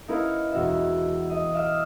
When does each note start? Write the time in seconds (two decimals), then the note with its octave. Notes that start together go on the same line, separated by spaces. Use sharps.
0.08 D#4 E4 A#4 B4 C#5 F5
0.52 E1 F#4 E5
1.30 D#5
1.54 E5 F5 D6 D#6 F6 E7